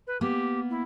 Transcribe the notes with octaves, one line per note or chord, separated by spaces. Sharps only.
B4
A#3 B3 G4
E4